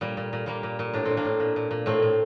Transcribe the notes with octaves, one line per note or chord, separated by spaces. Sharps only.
A#2 G3
A#2
A#2
A#2 G3 A#3
A#2
A#2
A2 D4
A2 C4
A#3 D4
A2
A#2
A#2
A#2
A2 A3 C4
A2